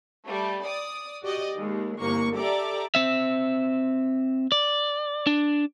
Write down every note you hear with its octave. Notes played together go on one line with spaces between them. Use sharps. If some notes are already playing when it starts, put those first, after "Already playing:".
G3 A3
D5 D#6
F#4 G4 D5 D#5
D#2 G#3
G1 C2 A#3 C#6
G4 A4 D5 E5 A#5 D6
C4 E5
D5
D4